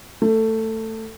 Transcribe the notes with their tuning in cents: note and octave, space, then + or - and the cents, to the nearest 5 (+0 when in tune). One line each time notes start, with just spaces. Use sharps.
A3 +15